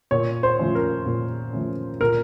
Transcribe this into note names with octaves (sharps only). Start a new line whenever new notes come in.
A#2 C#5
C5
F3 A3 C#4
A#4
A#2
F3 A3 C#4
A#2 A#4